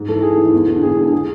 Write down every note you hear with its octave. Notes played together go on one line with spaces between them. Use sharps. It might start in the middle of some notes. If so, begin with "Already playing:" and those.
Already playing: G#2
E3 A4
G#2 G#4
E3
E2
D3
E2 G#4
D3 G#4
G#4